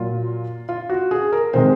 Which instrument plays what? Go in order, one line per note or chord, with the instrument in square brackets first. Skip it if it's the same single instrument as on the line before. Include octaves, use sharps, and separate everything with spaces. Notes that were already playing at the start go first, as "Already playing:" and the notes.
Already playing: [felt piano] A#2 F#3 F4
F4
F#4
G#4
A#4
C3 D#3 G#3 C5